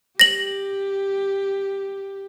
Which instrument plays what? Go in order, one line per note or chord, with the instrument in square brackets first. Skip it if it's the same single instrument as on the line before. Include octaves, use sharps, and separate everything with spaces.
[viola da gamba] G4 [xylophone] A#6 F#7